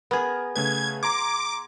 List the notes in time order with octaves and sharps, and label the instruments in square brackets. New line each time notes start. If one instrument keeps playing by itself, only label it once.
[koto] B3 G#4 [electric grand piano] A#4
[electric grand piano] C#3 A3 B4 [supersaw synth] G#6
[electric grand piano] A#5 C6 G#6 [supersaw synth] D6